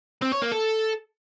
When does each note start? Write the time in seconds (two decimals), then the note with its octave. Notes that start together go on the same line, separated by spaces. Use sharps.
0.22 C4
0.32 C#5
0.42 A#3
0.52 A4